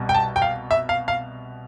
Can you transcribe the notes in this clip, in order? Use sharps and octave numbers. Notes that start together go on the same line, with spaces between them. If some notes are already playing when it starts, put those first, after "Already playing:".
Already playing: C2 B2 G3
G5
A5
G5
F5
E5
F5
F5